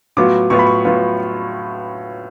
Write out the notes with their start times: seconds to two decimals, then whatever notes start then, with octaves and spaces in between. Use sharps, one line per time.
0.17 A2 F#3 B3 F4 D6
0.50 A2 F#3 B3 F4 C#6
0.59 B5
0.67 C#6
0.85 A2 F#3 B3 F4